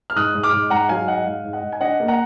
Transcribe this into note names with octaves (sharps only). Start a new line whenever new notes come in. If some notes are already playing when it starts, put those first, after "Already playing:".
F6
G#2 D#6 F#6
G#2
D6 F6
G#2
G#2 F#5 A#5
F#3 F5 G#5
G#2 D#5 F#5
G#2 F5
G#2
D#5 F#5
G#2
G#5
D4 D#5 F#5
A#3
F#5 A#5